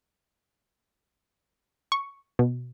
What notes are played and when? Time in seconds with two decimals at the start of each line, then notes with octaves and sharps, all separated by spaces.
1.92 C#6
2.39 B2